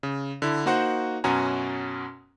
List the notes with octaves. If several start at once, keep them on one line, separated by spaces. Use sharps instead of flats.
C#3
D3 E4
A#3 D#4 F#4 C5 F#5
F#2 B2 C#4 F#4 G#5 A#5